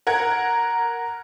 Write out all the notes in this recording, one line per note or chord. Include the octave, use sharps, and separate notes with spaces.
A#4 F#5 G#6